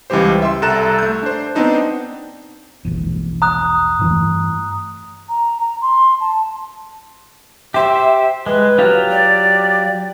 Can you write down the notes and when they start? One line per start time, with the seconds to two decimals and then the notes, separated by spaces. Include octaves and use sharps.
0.10 C#2 E3 G3 G4 C5
0.42 E5 C6
0.62 C2 A4 A#5 F#6 E7
0.99 A3 G6
1.23 D4 C5
1.55 B3 C4 D4 D#4 C5
2.85 E1 A#1 E2
3.42 A#5 D#6 F#6
3.99 G2 E3 A3
5.29 A#5
5.61 A#5
5.82 C6
6.21 A5
7.74 G4 C5 E5
8.46 G#3 B4
8.78 F#3 F4 G4
9.11 D5